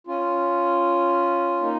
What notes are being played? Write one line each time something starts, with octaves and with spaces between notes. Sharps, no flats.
C#4 F4
A#3 D#4